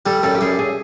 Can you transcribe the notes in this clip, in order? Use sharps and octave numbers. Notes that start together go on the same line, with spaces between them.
G3 A4
F#2 A4
G4
F#2 G#4
G#4